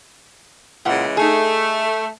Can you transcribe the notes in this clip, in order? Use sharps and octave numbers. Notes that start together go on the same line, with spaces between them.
A#2 C#3 E3 G#3 F#5
A3 D#4 G#4